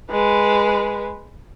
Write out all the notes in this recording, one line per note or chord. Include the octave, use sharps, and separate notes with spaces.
G#3 B4